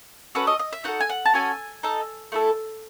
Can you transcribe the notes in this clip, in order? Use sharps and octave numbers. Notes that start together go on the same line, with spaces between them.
C#4 F#4 A4 B4
D#5
D#5
E5
D#4 F#4 A4 F#5
G#5
F#5
A5
C#4 F#4 A4 G#5
D#4 A4
A3 E4 A4